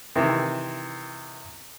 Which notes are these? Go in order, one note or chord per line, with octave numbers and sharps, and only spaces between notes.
C3 D#3 E3